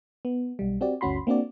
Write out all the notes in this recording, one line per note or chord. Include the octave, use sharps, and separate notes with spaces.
B3
B1 G3
C4 F#4 G4 D5
G1 D2 C#4 F#4 B5 C6
A#3 C4 D4 F#4 D5